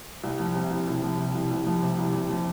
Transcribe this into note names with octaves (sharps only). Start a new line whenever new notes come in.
C2
F3
C3
C2
C2
F3
C3
C2
C2
F3
C3
C2
C2
F3